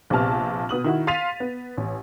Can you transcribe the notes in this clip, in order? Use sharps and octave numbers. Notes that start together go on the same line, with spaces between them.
A#1 C3 B3 A5 F6
B2 B3 D#6 F#7
D#3 E4 F#4
F5 C6 A6 B6 D#7 F7
B3
A1